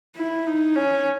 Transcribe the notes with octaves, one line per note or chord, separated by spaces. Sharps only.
E4
D#4
C#4